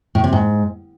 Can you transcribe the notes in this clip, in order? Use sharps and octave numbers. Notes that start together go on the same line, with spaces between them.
A2
C3
G#2